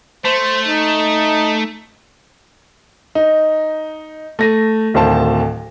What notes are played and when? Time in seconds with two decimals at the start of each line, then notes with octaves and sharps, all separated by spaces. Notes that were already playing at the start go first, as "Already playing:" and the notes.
0.25 A3 C5
0.67 D#4
3.15 D#4
4.39 A3 A#6 D#7
4.94 D1 D2 D#3 C5 F5 A5